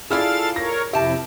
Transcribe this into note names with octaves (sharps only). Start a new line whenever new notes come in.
E4 F4 G#4 A4 D5 F5 F6 A6
A#4 C#5 A#6
F2 C3 E4 G4 E5 A5